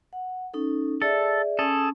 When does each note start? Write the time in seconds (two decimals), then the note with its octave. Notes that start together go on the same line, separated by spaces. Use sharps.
0.13 F#5
0.54 C#4 D#4 A4
1.02 G#4 A4 D5 E5
1.59 C#4 G#4 A4 A5